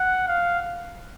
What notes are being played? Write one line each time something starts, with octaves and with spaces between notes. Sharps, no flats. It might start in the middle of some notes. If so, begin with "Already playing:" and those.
Already playing: F#5
F5